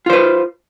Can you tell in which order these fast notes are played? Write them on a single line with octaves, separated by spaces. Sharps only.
F4 C5 B4